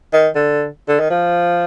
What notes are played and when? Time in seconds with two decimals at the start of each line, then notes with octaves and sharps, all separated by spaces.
0.13 D#3
0.35 D3
0.88 D3
0.99 D#3
1.10 F3